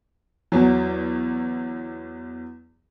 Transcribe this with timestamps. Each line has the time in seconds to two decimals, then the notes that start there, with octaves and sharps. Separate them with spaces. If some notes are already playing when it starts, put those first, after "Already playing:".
0.52 E2 F#3